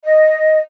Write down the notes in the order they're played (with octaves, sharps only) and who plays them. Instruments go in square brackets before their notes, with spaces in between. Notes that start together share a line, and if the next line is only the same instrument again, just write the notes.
[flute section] D#5